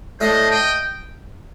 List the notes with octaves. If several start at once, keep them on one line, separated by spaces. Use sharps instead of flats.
A2 A3 D4 A4 C5 D#5
D#5 G5